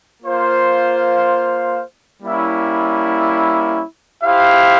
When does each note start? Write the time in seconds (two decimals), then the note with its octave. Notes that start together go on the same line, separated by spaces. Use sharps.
0.23 A#3 F4 C5 F5
2.22 G3 A#3 C#4 E4
4.23 E4 G4 C5 F5